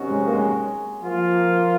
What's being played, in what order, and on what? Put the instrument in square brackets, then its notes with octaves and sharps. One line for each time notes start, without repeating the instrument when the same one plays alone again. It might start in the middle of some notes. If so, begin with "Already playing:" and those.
Already playing: [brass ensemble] C3 D#3 F#3 C#4 F#4
[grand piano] G#3
A#3
G#3
[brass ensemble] F3 A#3 F4